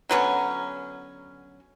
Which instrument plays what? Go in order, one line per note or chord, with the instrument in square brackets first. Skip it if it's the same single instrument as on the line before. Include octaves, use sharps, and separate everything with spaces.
[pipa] D3 F#3 B3 C#4